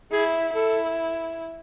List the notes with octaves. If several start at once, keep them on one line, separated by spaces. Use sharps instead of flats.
E4 G#4
E4 A4